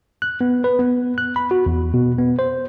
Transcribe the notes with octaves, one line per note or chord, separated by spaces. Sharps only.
F#6
B3
B4
B3
F#6
B5
F#4
E2
B2
B3
C5